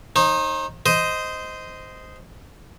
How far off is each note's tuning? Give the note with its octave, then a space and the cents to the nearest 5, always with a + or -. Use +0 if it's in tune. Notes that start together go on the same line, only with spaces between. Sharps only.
D#4 +0 C5 +45
C5 -15 D#5 +5